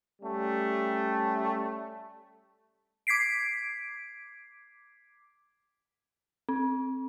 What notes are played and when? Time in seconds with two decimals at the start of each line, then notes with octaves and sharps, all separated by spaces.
0.21 G3 A3 C#4
3.07 D6 G#6 B6 C7 D7
6.49 C4